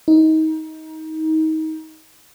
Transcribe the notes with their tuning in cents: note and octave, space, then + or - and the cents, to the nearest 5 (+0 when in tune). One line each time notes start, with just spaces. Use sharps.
D#4 +25